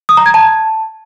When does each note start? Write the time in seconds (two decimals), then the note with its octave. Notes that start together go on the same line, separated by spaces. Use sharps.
0.09 D#6
0.17 A#5
0.26 G#6
0.34 A5